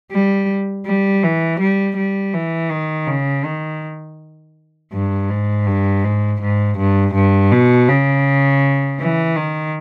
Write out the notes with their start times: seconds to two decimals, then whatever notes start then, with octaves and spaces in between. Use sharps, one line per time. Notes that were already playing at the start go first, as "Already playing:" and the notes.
0.11 G3
0.86 G3
1.23 E3
1.60 G3
1.96 G3
2.34 E3
2.71 D#3
3.07 C#3
3.45 D#3
4.92 G2
5.29 G#2
5.66 G2
6.04 G#2
6.41 G#2
6.77 G2
7.14 G2
7.51 B2
7.88 C#3
9.00 E3
9.36 D#3